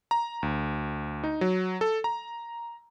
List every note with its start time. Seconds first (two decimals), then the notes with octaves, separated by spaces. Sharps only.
0.11 A#5
0.43 D2
1.24 D#4
1.41 F#3
1.81 A4
2.04 A#5